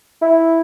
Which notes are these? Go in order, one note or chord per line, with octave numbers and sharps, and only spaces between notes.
E4